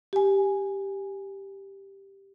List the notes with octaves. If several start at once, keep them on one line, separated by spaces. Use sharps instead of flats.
G4 G#5